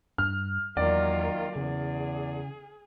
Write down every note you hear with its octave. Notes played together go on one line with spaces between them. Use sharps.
G2 F6
E2 D#3 F#3 A#3 F4 D5
E2 C#3 G#4